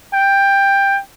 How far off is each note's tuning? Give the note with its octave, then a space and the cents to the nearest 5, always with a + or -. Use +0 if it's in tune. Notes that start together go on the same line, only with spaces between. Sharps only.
G5 +15